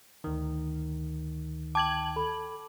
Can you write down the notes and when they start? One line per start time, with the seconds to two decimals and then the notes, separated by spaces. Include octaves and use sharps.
0.24 D2 D#3
1.75 G5 A5 D6 G#6 F#7
2.16 A4 B5